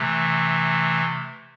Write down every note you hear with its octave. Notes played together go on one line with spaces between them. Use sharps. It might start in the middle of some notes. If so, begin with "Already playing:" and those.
Already playing: C3 E3 A3